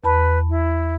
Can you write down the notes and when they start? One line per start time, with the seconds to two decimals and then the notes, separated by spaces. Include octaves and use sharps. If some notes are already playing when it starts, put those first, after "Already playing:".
0.04 E2 B4 A5 B5
0.49 E4